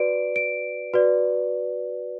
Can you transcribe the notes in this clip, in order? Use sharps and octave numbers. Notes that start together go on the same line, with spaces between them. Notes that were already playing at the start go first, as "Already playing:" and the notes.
Already playing: F#4 B4 D5 D7
D7
F#4 B4 D5